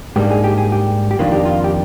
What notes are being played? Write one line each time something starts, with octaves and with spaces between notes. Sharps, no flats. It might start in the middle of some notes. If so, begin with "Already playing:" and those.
G#2 G3 A#3 D4 G4
G#4
G4
G#4
G4
G4
F2 D#3 A#3 D4 F4
G4
F4
G4